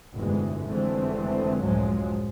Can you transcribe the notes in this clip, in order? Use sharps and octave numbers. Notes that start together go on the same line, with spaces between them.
F1 G2 B2 D3 E3 G#3
F1 D3 E3 G#3 A3 C4
C#2 F#2 A2 F3 F#3 G#3